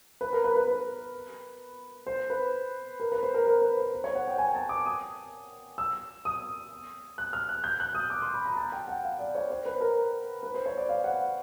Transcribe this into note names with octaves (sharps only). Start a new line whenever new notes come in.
B4
A#4
B4
B4
B4
C5
B4
A#4
B4
C5
A#4
A#4
B4
C5
C5
C#5
F#5
G5
G#5
A5
D6
D#6
E6
D#6
F#6
F6
F#6
G6
F#6
D#6
D6
C6
B5
A#5
A5
G5
F#5
F5
D5
C#5
C5
B4
A#4
B4
C5
C#5
D5
F5
F#5